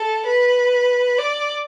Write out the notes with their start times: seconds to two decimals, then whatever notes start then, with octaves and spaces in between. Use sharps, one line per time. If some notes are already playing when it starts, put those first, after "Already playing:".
Already playing: A4
0.26 B4
1.19 D5